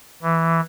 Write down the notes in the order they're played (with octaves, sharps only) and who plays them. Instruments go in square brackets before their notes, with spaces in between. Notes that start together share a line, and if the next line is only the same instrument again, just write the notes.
[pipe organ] E3